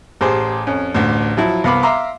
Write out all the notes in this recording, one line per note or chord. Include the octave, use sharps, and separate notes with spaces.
A1 G4 G#4 C5
F2 C#4
A1 D2
F3 F#3 E4
C2 B3 F5 B5 D6
E5 F5 A#5 C6 D6